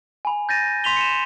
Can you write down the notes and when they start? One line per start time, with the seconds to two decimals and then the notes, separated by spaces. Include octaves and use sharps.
0.25 G#5 B5
0.49 G6 A6 A#6 D#7
0.84 C6 B6 F7 G7
0.97 C#7 D#7 E7